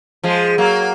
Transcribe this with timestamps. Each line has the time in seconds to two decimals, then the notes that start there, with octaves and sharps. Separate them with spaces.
0.24 F3 G#3
0.58 F#3 A#3